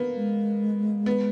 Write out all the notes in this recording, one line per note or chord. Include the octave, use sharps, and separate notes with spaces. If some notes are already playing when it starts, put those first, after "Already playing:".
Already playing: A#3 B3
G#3
B3